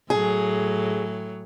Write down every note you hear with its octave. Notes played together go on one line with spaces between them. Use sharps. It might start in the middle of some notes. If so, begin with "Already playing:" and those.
A2 F#3 G#4